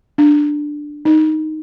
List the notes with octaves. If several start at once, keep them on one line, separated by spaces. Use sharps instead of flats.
D4
D#4